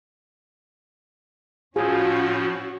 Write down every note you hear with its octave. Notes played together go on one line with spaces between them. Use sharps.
A2 F3 C#4 F4 F#4 G#4